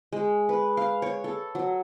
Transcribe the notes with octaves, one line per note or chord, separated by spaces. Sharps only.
G#3
B4
F5
C#5
A4
F#3